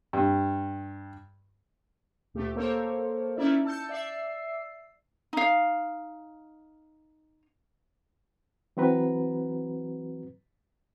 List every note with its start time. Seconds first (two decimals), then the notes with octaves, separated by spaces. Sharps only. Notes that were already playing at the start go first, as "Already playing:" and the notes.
0.13 G2
2.34 D2 A#2 A3 G4
2.56 A#3 A4 A#4 C5 C#5
3.37 C#4 D#4 E4 D5 E5
3.65 A5 E6 G6 C#7
3.89 D5 E5 E6 C7
5.33 D#4 F5
8.77 E3 F#3 C4 F#4 B4 A#5